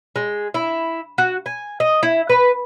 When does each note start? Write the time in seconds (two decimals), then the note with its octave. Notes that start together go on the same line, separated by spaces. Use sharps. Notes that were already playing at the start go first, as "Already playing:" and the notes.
0.16 G#3
0.54 E4
1.18 F#4
1.46 G#5
1.80 D#5
2.03 E4
2.29 B4